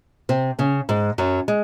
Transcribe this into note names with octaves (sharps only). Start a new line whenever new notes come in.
C3 C4
C#3 C#4
G#2 G#3
F#2 F#3
G#3